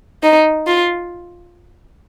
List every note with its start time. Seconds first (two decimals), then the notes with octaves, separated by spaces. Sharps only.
0.23 D#4
0.67 F4